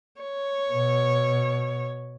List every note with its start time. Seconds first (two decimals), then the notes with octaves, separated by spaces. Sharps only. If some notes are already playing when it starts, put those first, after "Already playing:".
0.22 C#5
0.72 B2